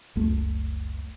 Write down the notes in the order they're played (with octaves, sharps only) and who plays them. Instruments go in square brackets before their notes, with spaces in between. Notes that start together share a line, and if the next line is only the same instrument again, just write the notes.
[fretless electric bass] F#1 C#2 A3